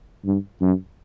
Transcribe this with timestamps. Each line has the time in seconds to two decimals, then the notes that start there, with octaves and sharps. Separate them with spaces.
0.25 G2
0.61 F#2